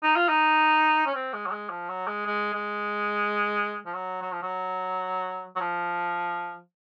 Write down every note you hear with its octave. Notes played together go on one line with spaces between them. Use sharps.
D#4
F4
D#4
C#4
C4
G#3
F#3
G#3
F3
F#3
G#3
G#3
G#3
F3
F#3
F#3
F3
F#3
F#3
F3